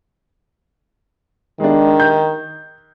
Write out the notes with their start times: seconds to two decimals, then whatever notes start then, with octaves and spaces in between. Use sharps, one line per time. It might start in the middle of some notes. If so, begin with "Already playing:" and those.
1.60 D#3 G#3 D4
2.00 G6